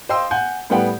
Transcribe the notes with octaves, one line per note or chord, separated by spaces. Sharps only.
C5 D#5 F5 G5 C6 E6
F#5 G#5 G6
A2 G3 B3 F#5 G5